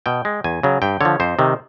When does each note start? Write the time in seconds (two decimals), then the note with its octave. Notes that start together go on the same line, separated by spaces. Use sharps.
0.06 B2 G5
0.25 G#3
0.44 E2 G#5
0.63 C#3 F#3
0.82 G2 G5
1.01 D3 F3 C#5
1.20 F2 C5
1.39 C3 D#3